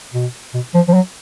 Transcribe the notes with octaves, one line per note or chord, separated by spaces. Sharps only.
B2
B2
F3
F3
F#3